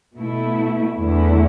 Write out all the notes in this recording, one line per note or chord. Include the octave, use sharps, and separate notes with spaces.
B2 A3 E4
E2 D3 A3 E4